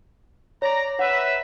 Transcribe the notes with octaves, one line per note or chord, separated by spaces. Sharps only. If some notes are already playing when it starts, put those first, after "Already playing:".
C#5 D5 A#5
B4 C#5 E5 F#5